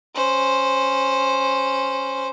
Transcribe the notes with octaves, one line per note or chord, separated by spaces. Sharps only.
C#4 C5